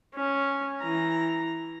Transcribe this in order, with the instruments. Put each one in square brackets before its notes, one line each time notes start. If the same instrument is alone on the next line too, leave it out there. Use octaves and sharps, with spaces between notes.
[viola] C#4
E3 A#5